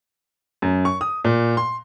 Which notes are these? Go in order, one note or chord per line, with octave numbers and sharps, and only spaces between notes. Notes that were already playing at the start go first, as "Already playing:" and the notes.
F#2
C#6
D#6
A#2
C6